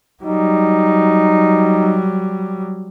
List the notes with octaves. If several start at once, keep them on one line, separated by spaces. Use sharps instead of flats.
F#3 G3 D#4